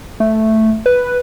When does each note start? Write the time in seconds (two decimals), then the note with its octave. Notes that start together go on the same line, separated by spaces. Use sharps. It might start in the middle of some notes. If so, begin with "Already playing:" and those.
0.20 A3
0.86 B4